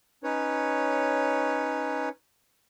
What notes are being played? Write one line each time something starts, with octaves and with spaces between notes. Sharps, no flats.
C#4 D#4 B4 C#5